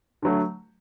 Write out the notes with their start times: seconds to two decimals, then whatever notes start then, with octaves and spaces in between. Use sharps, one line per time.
0.22 D3 F#3 A3